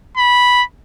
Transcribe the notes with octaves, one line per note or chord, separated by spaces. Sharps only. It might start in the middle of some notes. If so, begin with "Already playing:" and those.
B5